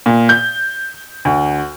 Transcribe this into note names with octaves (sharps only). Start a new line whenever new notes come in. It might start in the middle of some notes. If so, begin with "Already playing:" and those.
A#2
G6
D2